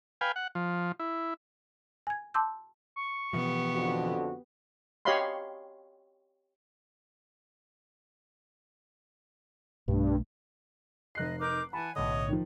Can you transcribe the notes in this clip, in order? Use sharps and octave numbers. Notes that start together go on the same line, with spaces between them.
B4 F5 G5 G#5
F#5
F3
E4
G#5 G#6
A5 C6 D6 E6 G6
C#6
B2 E3 F3 B3 G4
F2 D3 F#4
G4 C#5 D#5 F5 B5 C6
B1 G2 A3
F1 D#5 F#6 C7
D#4 A#4 D6 G6
E3 F#5 G#5 A5 B5
B1 A2 D3 C#5 D#5
D#3 F3